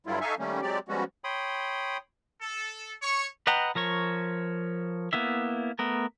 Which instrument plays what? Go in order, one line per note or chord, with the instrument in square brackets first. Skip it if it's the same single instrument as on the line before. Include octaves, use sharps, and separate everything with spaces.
[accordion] G2 D3 F#3 G3 E4 F4
D#4 A4 E5 F5 G#5 C#6
D#3 G3 A3 A#3 C#4
F#3 G#3 C4 G4 D5
F3 G3 G#3 B3 C#4 F#4
[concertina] C#5 G5 B5 C6 D#6
[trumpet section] A4
C#5 C#6
[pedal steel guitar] B4 D#5 F#5 G5 A#5
F3 A#4 C#5 C#6
A#3 B3 E4 E5
A3 B3 A#4